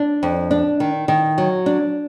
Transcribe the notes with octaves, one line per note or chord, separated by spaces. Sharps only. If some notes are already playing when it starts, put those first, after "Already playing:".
Already playing: D4
F2
D4
D#3
D#3
F#3
D4